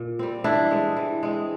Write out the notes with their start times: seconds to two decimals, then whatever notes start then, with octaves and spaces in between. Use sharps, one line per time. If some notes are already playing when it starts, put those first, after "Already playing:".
Already playing: A#2
0.19 G3 C4
0.44 E3 D4 E4
0.71 G#3 C4
0.97 E3
1.23 G#3 C4